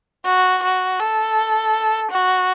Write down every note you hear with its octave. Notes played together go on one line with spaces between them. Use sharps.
F#4
F#4
A4
F#4